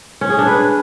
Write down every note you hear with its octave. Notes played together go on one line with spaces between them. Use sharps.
C#4
G#4
D4
B4